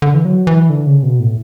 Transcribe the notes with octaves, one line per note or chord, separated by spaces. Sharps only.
D3
E3
F#3
E3
D3
C#3
B2
A2